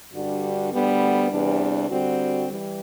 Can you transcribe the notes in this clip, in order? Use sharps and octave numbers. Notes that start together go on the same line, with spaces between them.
G2 D3 G3 D4 F#4
D2 D3 G3 B3
E2 C3 E3 G3 D4
D3 G3 C4 F#4
E3 G3